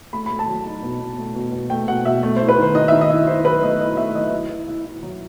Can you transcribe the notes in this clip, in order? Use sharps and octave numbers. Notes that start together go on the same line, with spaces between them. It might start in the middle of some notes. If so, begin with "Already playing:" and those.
A3 B5
B5
A3
A5
F#3
D#4
B2
B2
A3
B2
B2
A3 G5
B2 F#5
B2 E5
A3
C5
E4
B4
D#3 C5
D#3 D#5
E5
D#3
D#5
E4
E4 C5
F#3 B4
A3 D#5
E4 D#5
A3 E5
F#3 D#5
E4
E4
E4
E4
F#3